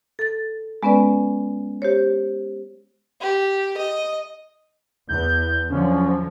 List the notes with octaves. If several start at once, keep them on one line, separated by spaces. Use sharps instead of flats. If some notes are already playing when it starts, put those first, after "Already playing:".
A4 A6
G#3 B3 C#4 B4 D5
G4 C5 C#5
G4
D#5
E2 G6
D3 F3 F#3 C#4